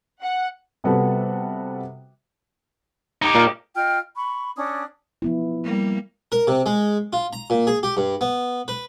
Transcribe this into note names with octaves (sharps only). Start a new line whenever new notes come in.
F#5
C3 G3 B3 F#4 A4
D#4 G4
A#2 A#4 F5
F4 D#5 G5 F6
B5 C#6
C#4 D4 D#6
F3 B3 E4
G3 A#3
A#4
C3
G#3
F4
A#5
A#2
G#4
G4
G2
B3
B4